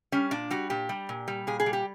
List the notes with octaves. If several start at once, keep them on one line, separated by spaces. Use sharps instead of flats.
G3 C#4
A#2 D4
G3 F#4
A#2 G4
G3
A#2
G3
A#2 G#4
G#4
G3
G4